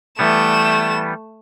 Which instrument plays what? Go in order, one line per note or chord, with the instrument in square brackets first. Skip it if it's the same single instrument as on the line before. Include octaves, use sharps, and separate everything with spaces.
[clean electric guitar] E3 G3 B3 [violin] A3 E7